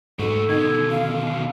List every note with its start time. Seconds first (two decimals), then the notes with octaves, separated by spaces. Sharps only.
0.19 G#2 A3 F#4 A4
0.49 B2 D3 D#3 G#6
0.91 F5